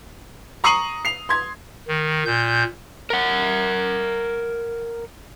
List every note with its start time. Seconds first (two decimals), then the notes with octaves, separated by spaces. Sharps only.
0.64 A#5 C#6 D#6 C7 D#7 F#7
1.05 C7 F7
1.29 C6 G#6
1.88 D#3
2.26 A#2 G6
3.10 A#4 F#5